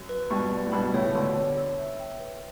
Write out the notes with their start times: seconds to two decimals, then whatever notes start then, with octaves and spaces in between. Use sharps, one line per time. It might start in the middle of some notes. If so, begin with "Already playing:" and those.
Already playing: F#2
0.09 B4
0.30 G2 B2 C#6
0.51 D5
0.66 A2
0.72 G2 B2 B5
0.94 A2 C#3 C#5
1.15 B2 D3 C#6
1.36 C#5
1.57 E6
1.78 E5
1.99 G5
2.20 B4